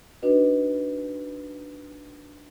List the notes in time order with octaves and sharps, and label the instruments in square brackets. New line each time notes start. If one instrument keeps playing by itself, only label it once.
[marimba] D4 D#4 F#4 B4 D#5